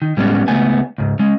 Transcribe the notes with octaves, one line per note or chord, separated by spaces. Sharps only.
D#3
A2 G3 G#3 A#3 B3 C#4
C#2 A3 B3 G#5
C#2 G#2
G#3 C#4